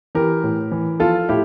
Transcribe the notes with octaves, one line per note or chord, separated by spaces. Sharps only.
E3 G4 A#4
A2
E3
F3 F4 A4
A2 E4 G4